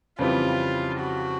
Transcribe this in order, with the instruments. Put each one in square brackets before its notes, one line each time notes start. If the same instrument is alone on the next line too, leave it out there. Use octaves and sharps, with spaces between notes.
[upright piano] F2 C#3 E3 G3 C4 [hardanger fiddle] F4
[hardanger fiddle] F#4